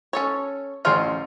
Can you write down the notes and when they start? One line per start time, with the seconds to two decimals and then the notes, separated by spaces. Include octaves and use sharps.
0.13 C#4 A4 C#5
0.85 A1 C#4 F4 C5 F6